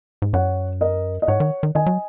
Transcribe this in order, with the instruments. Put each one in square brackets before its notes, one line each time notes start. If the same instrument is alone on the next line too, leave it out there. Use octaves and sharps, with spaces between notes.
[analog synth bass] G#2
[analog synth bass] F#2 [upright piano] C#5 F#5
[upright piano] A#4 D#5
D#5
[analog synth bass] G#2 [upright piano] C#5 F#5
[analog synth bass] D#3
D#3
[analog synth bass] D#3 [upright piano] D#5 G#5
[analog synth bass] F#3